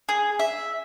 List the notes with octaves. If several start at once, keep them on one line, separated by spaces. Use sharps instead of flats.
G#4
E5